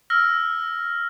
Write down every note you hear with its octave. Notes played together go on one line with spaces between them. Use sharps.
E6 F6 A#6